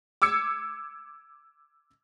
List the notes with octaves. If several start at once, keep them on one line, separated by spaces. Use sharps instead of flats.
D6 E6 G#6 C#7